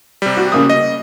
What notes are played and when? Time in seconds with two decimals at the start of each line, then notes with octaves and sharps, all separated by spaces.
0.22 C3 G3
0.37 F#4
0.52 C#3 A#3 D#6
0.70 D#5